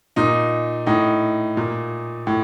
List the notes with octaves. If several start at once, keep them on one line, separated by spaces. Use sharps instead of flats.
A#2 D#4
A2 D#4
A#2
A2